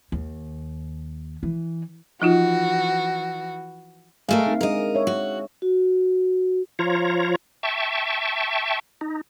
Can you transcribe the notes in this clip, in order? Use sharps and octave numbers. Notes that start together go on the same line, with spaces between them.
D#2
E3
E3 F3 D#4 F4 F#4
G#3 A3 A#4 F5
C4 D#4
G#3 D4 G#4 A#4 D#5
C#5 E5
F#4
F#4
F3 F4 C#5 A#5
E5 G5 A5 C#6
D#4